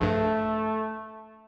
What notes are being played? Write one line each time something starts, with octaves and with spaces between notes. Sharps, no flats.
A#1 G2 A3